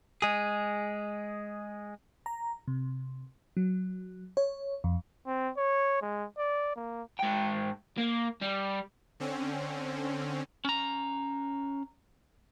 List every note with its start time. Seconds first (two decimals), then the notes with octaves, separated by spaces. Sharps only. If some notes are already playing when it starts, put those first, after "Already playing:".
0.22 G#3 G#4
2.26 A#5
2.68 C3
3.57 F#3
4.37 C#5
4.84 F2
5.26 C4
5.57 C#5
6.02 G#3
6.38 D5
6.76 A#3
7.20 G#2 G5
7.98 A#3
8.41 G3
9.20 D3 C4 C#4
10.65 C#4 A#5